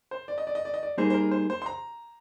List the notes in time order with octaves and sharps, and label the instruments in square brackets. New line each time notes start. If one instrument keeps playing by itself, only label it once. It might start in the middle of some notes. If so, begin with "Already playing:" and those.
[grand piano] C5
D5
D#5
D5
D#5
D5
D#5
D5
[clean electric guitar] G3 A#3 D#4 G#4 [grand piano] C5
[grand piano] C5
A#4
C5
C5
C6
A#5